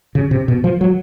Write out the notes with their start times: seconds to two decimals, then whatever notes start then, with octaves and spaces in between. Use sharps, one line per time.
0.15 C#3
0.31 C3
0.48 B2
0.64 F3
0.81 F#3